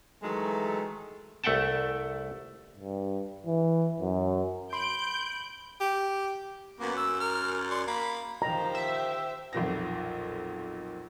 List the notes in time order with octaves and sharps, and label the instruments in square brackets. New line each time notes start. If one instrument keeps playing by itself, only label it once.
[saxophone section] D#3 E3 F#3 G#3 A3
[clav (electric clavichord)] C2 A3 E5 F#5 G5 A5
[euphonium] G2
E3
F#2
[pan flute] B5 [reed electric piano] C6 [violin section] G6 D7
[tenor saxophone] G4
[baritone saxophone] F#2 [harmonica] A#3 B3
[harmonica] E6
A#4 F6
D5 C6 C#6
[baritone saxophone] A#3 [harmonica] B5
[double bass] D#3 F3 [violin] G4 C5 [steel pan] A#5
[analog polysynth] E5
[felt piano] B1 F2 A#2 A#6